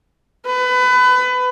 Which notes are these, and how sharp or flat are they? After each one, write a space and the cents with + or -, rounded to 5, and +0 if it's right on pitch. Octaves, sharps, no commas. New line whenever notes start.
B4 +25